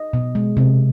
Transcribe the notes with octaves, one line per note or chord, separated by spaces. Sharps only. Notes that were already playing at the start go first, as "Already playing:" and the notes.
Already playing: D#5
B2
G#3
C3